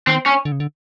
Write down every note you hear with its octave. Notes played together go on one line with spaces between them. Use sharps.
D#3 C4
C#4
D3
C#3
D3